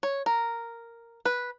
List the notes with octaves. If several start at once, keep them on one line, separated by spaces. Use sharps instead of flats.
C#5
A#4
B4